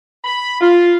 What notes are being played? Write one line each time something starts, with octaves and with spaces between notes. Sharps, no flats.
B5
F4